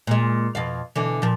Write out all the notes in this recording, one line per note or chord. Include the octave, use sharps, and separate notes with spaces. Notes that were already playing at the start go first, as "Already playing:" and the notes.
A#2 G#3
F2 B2 F5
B2 D3 E3
A#2 F3